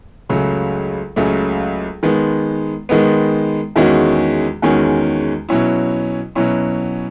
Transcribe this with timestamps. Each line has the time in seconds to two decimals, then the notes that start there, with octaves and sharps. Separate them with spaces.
0.29 C#2 C#3 F#3 A3
1.16 C#2 C#3 F#3 A3
2.03 D#3 G#3 B3
2.89 D#3 G#3 B3
3.76 E2 D#3 G#3 C#4 F#4
4.62 E2 D#3 G#3 C#4 F#4
5.49 B2 F#3 C#4 E4
6.35 B2 F#3 C#4 E4